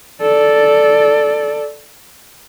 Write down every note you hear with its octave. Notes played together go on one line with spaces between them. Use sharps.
A4 D5